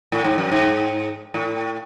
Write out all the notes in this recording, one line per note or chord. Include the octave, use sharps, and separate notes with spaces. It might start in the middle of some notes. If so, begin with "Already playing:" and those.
A2
G#2
F#2
G#2
A2